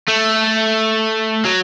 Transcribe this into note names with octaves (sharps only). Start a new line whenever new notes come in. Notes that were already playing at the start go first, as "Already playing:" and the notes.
A3
F#3